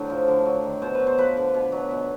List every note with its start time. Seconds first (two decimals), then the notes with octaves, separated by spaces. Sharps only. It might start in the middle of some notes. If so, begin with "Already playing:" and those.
Already playing: A2 D3 F#3 C5
0.10 F3
0.28 D3
0.45 F#3
0.64 D#3
0.82 B2 C5
0.94 B4
1.00 F#3
1.07 C5
1.18 F3 B4
1.37 D3
1.54 B2
1.72 F#3
1.91 B2